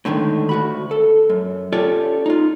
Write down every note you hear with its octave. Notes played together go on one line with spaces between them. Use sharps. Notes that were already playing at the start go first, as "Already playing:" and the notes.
A2 D3 D#3 G#3
D2 F#4 B5
A4
F#2
C#4 F4 G4 A4 C#5 D5
D#4 F4